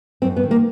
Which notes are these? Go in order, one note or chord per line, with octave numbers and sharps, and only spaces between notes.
F#2 C4
B3
D#3
A#3